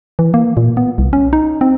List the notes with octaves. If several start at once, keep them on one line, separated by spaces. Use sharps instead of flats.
E3
A#3
A#2
B3
C2
C#4
D#4
C4